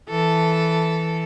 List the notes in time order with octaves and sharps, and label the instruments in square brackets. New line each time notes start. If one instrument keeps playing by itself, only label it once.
[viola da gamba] E3 A4